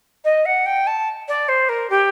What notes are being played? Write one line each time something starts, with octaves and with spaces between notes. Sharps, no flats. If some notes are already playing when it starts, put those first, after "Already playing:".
D#5
F#5
G5
A5
D5
C5
A#4
G4